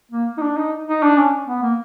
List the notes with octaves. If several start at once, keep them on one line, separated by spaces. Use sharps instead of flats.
A#3
D#4
D4
D#4
D#4
D4
C#4
B3
A#3